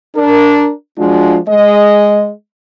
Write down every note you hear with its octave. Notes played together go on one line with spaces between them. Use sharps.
D4 A#4
F3 G#3 D4 F4 F#4
G#3 D#5